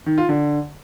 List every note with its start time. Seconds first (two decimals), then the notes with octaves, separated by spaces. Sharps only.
0.06 D#3
0.18 F4
0.29 D3